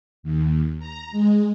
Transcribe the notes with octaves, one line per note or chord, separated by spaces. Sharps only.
D#2
A#5
G#3